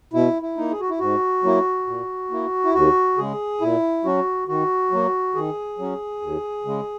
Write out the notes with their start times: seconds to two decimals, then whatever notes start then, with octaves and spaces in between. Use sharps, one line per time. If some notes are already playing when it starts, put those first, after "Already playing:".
0.13 B2 E4
0.42 E4
0.57 A#3 D#4
0.71 G#4
0.80 F#4
0.90 E4
1.00 G#2 F#4
1.43 F#3 A#3 E4
1.87 A#2
2.31 A#3 E4
2.65 E4
2.74 D#2 F#4
3.17 C#3 G#3 G#4
3.61 A#2 E4
4.05 F#3 C#4 F#4
4.48 D#3 F#4
4.91 F#3 A#3
5.35 D#3 G#4
5.79 F#3 C#4
6.22 D#2
6.65 C#3 G#3